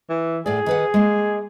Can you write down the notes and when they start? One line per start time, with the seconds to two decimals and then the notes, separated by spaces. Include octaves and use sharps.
0.09 E3
0.46 A2 G#4 D5
0.66 D#3 B4 F#5
0.94 G#3 A#3